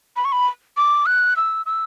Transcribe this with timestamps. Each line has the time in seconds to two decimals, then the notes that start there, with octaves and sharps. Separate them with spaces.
0.16 B5
0.25 C#6
0.32 B5
0.77 D6
1.06 F#6
1.36 E6
1.66 E6